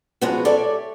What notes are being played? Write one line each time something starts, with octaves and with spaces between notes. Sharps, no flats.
F3 G#3 B3 C#4 F#4
G4 A4 C#5 D5 E5